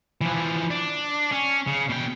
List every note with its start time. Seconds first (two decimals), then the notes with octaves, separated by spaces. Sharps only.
0.21 E3 F3
0.71 D4
1.32 C#4
1.67 C#3
1.89 B2 G5